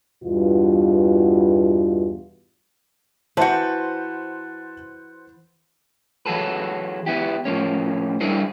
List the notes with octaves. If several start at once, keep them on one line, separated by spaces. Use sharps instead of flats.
E2 G2 B2 F4
E3 F#4 B4 C5 E5 F#5 A5 G6
E3 F#3 G#4 A4 B4
B3 E4 G4
A2 F3 A#3 C#4
G3 D4 E4 G#4 A#4 C5